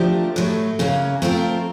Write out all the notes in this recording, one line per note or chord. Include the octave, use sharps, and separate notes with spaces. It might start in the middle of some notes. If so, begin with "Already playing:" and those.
Already playing: F3 A3 D4 G4 A#4
A2 F#3 A3
C#3 F#3 A#3 C#4
F3 A3 C4 F4 A#4